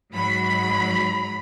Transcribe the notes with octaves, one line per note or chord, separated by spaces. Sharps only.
G#2 F#3 B5